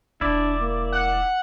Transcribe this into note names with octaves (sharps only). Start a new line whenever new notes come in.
E1 D4 E4 D5
A#3
F#5